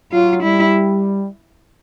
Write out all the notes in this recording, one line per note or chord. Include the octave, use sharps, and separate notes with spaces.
F#3 F4
G3 E4